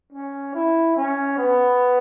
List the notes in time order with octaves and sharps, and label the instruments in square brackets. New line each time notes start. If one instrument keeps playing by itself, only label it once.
[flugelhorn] C#4
E4
C#4
B3